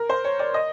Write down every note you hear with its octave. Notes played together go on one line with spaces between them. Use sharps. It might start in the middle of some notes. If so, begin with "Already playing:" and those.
Already playing: A#4
C5
C#5
D5
D#5